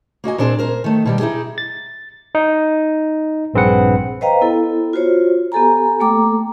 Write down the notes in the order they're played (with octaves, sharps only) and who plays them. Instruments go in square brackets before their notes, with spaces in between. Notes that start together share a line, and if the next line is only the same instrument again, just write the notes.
[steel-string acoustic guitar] A#3 F#4 D#5 G#5
A#2 C4 D4 G#4 C5
A#4 C5
D#3 A3
B2 D#3 G3
D#4 E4 G4 G#4
[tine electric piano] A6
D#4
A#1 G2 C4 G#4 B4 F#5
[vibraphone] B4 C5 D#5 F5 G5 A#5
B3 E4 A4
F4 F#4 C5 C#5
B3 G4 A4 G#5 A#5
A3 A#3 A4 G5 A#5 D6